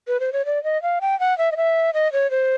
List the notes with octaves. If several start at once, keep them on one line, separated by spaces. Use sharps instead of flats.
B4
C5
C#5
D5
D#5
F5
G5
F#5
E5
D#5
E5
D#5
C#5
C5